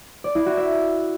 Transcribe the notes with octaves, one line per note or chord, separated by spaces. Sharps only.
D5
E4
F#4
E5